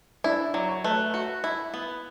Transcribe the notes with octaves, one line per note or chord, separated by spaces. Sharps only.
D4 E4
F#3 D5
C#5
A3 B4
F#4
E4
B3